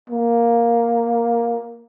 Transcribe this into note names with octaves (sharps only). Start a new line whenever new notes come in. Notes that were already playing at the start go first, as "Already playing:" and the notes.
A#3